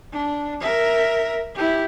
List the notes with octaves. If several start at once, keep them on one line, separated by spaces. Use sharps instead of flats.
D4
A#4 E5
E4 G4